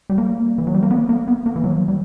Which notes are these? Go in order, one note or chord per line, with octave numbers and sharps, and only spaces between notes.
G3
A#3
E3
F#3
G3
A#3
B3
A#3
B3
A#3
E3
F#3
G3